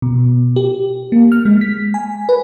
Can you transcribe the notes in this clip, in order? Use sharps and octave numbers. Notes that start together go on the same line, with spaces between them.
B2
G4
A#3
F6
G#3
B6
G#5
B4